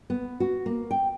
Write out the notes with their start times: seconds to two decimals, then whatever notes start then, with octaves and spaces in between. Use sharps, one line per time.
0.10 B3
0.40 F#4
0.66 A#3
0.91 G5